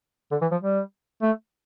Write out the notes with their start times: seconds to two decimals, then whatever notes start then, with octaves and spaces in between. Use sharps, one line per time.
0.32 D3
0.41 E3
0.51 F3
0.62 G3
1.22 A3